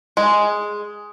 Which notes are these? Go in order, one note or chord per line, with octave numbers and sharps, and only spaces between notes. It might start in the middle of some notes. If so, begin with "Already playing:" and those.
G#3